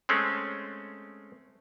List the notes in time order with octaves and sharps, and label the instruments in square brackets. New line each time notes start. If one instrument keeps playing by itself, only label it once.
[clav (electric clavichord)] G#3 A3 C4 C#4